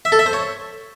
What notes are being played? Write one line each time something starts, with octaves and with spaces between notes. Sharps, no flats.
E5
A4
E5
C5
C#5